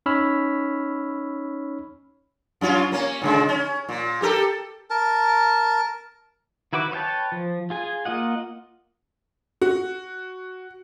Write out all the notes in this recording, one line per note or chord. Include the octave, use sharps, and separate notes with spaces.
C#4 D#4 C#5 B5 E6 F6
F#2 C#4 F4
A#3 C#4
A#2 C#3 G#3
C#4
A#2
G4 A4 A#4
A#4 A5
D#3 E4 F#4 B4 D6
B4 C#5 E5 G5 A5
F3
F4 G#4 G#5
A#3 F4 D#5 F#5
F#4